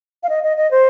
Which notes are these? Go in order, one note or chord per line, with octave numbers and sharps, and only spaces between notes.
F5
D#5
D#5
D#5
C5